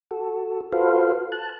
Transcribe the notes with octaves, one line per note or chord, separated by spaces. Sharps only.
F#4 A4
F4 F#4 A4 B4 C5 F5
A5 F#6